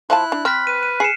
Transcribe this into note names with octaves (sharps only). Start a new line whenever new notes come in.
F3 E4 F5 A5 F#6
D4
C4 B5 F6 F#6 B6
B4 D#7
D#7
G#4 C7 C#7 E7